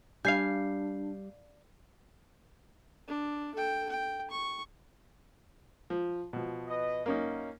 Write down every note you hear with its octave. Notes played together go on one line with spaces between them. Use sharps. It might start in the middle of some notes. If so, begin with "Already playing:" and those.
G3 D4 F5 G#5 G6 C7
D4
A4 G5
G5
C#6
F3
B2 F3
B4 D#5
F#2 A#3 C#4 D#4